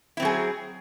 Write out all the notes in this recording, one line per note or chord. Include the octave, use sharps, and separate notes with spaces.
F#3 C4 E4 G#4